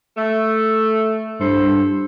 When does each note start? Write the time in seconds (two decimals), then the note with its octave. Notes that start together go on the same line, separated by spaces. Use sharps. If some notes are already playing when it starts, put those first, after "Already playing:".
0.17 A3
1.40 G2 E4 A4 C5